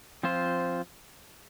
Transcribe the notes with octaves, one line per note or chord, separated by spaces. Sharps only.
F3 C4 F4 C5